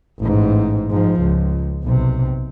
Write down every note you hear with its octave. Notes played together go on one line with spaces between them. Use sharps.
A1 G#2
G#2 F3
C#2
B1 C3